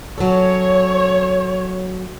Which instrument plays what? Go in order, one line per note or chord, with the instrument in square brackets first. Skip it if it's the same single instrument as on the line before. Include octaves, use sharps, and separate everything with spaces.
[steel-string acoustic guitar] F#3 C#4 A4 [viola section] C#5